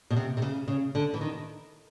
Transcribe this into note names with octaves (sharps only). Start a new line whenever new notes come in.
B2
C3
C3
C#3
C#3
D3
E3
D#3